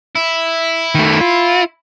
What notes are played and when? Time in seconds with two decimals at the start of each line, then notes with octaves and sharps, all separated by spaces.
0.16 E4
0.95 D#3 A3
1.21 F4